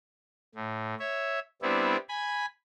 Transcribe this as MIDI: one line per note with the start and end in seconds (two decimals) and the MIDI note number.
0.55 0.94 45
0.99 1.39 73
0.99 1.39 76
1.62 1.97 55
1.62 1.97 59
1.62 1.97 60
1.62 1.97 62
1.62 1.97 64
2.09 2.46 80
2.09 2.46 83